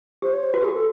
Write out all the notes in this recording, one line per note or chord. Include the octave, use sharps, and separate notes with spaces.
G4 C5
C#5
C5
F#4 B4
G4
F#4 G#4
A4